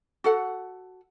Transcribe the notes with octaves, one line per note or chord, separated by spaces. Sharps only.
F#4 A4 F#5